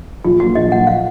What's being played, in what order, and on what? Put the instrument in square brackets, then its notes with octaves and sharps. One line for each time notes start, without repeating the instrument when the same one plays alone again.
[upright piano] A#1 [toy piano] F4
[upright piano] A#2 F#3 A#3 [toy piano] F#4
[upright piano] A#1 [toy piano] D#5
[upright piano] A#2 F#3 A#3 [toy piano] F#5
[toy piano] F5